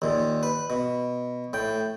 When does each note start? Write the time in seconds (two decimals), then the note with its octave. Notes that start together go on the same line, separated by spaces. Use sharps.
0.02 D#2 A#2
0.43 B4
0.70 B2
1.53 A2 G5